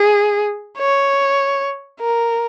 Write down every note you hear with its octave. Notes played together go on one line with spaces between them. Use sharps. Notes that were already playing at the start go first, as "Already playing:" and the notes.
Already playing: G#4
C#5
A#4